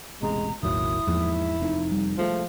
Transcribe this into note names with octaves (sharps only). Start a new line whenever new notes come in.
E1 A1 C3 G#3 A#5
E1 A1 D#3 F#3 A#3 E4 D#6
E2 G#2 F3 A#3
F1 F2 D#4
G3
C2 F3 G#3 A3